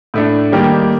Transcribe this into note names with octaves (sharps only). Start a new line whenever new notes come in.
A2 A3 D4
D#3 G3 A#3 D#4 G4